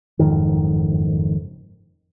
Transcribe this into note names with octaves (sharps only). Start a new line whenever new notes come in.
F#1 F2 G#2 D#3